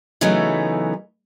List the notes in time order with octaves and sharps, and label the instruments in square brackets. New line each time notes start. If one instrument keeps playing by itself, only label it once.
[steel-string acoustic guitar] C#3 E3 F#3 A3 B3 D#4